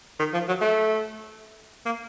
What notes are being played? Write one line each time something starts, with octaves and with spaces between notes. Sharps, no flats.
D#3
F3
F#3
A3
A#3